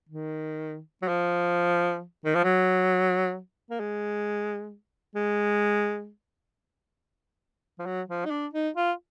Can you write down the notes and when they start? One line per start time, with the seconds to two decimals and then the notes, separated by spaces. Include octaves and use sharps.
0.09 D#3
1.02 F#3
1.08 F3
2.25 D#3
2.35 F3
2.44 F#3
3.70 A#3
3.80 G#3
5.15 G#3
7.79 F3
7.86 F#3
8.08 F3
8.25 D#4
8.31 D4
8.53 D#4
8.76 F4